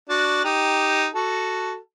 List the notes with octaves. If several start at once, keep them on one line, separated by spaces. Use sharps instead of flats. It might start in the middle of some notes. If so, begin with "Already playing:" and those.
D4 F#4
D#4 G4
F#4 A4